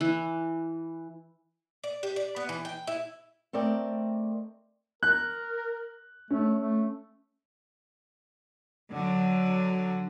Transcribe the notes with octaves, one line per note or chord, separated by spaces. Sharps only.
E3
D5
G4
D5
B3
E3
G5
E4
A3 C4 A#4 D5 D#5 G5
A#4 F#6
A3 C#4
A3
D3 F#3